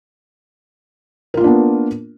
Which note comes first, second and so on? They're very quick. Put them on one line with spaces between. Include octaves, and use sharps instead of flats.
A#4 F4 A#3 D4 B3